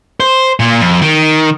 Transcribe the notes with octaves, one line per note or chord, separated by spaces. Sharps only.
C5
A#2
F2
D#3